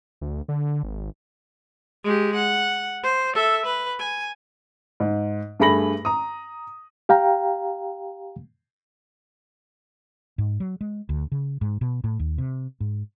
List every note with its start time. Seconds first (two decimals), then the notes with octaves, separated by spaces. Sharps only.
0.21 D2
0.48 D3
0.83 G#1
2.04 G#3 G4
2.35 F#5
3.03 C5
3.35 A4 E5
3.66 B4
4.00 G#5
5.00 G#2
5.60 G2 A3 G#4 B5 A#6 F#7
6.05 A#5 D#6
7.09 G4 F5 G5 A#5
10.38 G#2
10.60 F#3
10.81 G#3
11.09 D2
11.32 C#3
11.61 G#2
11.81 B2
12.04 A2
12.19 D#2
12.38 C3
12.80 G#2